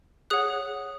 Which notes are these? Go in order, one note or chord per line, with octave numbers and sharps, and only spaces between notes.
G#4 C#5 F#5 D#6 F#6